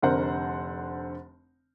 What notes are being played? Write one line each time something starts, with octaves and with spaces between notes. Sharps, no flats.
F1 D3 A#4 C5 F#5